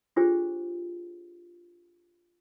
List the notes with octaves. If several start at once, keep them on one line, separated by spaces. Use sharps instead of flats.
D4 F4 G4 G#4 C5